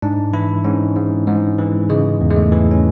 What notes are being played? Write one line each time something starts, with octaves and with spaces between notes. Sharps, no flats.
G#2 D4
E3 E4
G#2 C#4
G#2
G#2 G#3
E3
C#3 G#3
E2
G#3
A3
E3
C#4